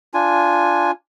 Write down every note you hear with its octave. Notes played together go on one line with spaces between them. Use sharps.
D4 F4 G#5